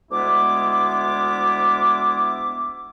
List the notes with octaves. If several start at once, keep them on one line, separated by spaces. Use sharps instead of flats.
D2 G#3 B3 E4 D6